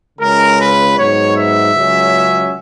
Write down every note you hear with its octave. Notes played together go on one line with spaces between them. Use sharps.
C#2 C#3 G#3 C#4 A#4
B4
G#2 F#3 B3 C#5
E5
C#2 C#3 F#3 C#4